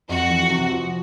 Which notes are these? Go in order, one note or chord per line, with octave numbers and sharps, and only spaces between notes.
F2 F#4
E3
C3
F3